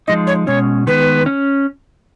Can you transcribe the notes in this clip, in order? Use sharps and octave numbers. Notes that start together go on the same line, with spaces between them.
F3 G#3 D#4 D#5
C#5
B2 G#3 C#4 C#5
D#3 G#3 B3 B4
C#4